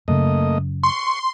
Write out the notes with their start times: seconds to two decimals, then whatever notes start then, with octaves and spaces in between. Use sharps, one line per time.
0.08 F#2 C#3 A3 A#3 D#5
0.83 C6 C#6